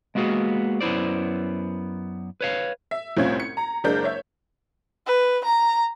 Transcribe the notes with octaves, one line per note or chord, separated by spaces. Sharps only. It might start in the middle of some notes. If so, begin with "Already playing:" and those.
G#3 A#3 B3 F#4 G#4
F#2 B3 E4 C5 D5
B4 C#5 F5
E5
C2 A2 C4 C#4 F4 G#6
C#7
A#5
F#1 G#3 D4 A#4 G6
C#5 E5
B4
A#5